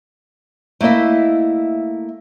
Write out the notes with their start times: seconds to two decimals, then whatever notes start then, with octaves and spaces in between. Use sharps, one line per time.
0.81 A3 A#3 E4 D#5 E5